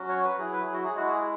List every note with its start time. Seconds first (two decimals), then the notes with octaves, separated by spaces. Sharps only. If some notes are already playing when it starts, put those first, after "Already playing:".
Already playing: F#3 C#4 F#4
0.09 C#5
0.24 B4
0.38 F#3 E4 G#4
0.53 B4
0.63 G#4
0.73 F#4
0.84 G#4
0.96 G#3 E4 F#4
1.10 G#4